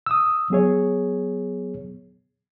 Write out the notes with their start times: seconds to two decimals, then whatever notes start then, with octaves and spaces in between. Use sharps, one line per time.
0.06 D#6 E6
0.50 F#3 B3 G#4 C#5